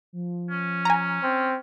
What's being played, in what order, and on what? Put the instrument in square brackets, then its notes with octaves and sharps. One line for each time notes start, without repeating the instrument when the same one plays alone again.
[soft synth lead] F3
[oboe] C#4
[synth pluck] G#5 A#5
[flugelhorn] C4